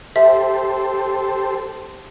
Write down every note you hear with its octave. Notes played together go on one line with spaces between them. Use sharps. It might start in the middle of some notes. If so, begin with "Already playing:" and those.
G4 A4 C5 E5